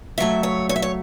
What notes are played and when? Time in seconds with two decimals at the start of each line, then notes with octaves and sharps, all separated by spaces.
0.18 C#3 F#3 A3 E5
0.43 C#5
0.69 C#5
0.76 E5
0.82 C#5